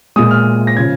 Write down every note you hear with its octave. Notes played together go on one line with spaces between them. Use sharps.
A#2 G#3 D#6
F6
A#6
C#3 F3 G#6